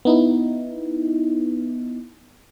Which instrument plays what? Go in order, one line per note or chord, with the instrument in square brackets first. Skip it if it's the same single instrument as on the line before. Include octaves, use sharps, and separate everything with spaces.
[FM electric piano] B3 D#4 E4